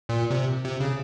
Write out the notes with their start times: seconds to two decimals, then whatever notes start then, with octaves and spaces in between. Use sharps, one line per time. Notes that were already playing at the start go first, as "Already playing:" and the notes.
0.09 A#2
0.31 C3
0.65 C3
0.80 C#3